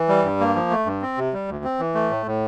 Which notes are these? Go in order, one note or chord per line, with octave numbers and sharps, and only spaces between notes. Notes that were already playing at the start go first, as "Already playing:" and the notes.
Already playing: E3
G3
G2
A#3
F3
A3
G2
C4
C3
G3
D2
C4
E3
A3
A2
A2